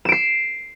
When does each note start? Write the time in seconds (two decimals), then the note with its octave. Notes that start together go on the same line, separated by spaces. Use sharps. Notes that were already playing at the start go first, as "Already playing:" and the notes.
0.05 E7
0.09 D7
0.12 C7